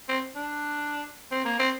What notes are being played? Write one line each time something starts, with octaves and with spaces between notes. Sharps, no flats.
C4
D4
C4
A#3
C4